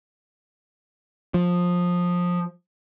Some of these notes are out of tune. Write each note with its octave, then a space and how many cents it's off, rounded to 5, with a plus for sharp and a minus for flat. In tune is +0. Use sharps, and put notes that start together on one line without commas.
F3 +20